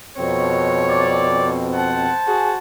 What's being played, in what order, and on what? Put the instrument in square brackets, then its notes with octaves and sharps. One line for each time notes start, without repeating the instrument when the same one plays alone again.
[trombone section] F2 B2 C4 [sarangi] C#5
[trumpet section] D5
[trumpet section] C5 A5 [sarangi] F#5
[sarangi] F#4 [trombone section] G#4